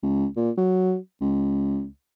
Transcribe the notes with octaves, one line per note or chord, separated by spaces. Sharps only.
C#2
A#2
F#3
C#2